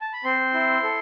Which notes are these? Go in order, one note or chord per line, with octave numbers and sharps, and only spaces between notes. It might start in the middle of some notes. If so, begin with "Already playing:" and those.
A5
B5
C4 C6
E4
A4